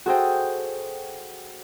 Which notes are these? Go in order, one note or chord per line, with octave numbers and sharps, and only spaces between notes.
F#4 G#4 A4 C5 D#5 G5